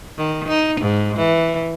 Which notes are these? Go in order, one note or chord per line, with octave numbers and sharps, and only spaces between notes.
D#3
D#4
G#2
E3